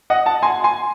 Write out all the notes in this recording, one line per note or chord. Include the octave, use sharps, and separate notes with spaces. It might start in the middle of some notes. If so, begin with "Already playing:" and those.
D#5 F#5
F#5 A5
G#5 C6
G#5 C6